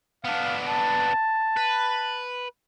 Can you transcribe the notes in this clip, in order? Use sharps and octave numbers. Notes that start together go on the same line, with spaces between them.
B3 D4 F5
A5
B4